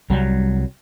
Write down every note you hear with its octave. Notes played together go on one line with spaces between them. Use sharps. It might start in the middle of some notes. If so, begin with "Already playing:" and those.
C2 F#3 G3